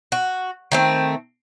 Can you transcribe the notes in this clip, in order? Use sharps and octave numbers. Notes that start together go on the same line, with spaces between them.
F#4
D#3 A3 C4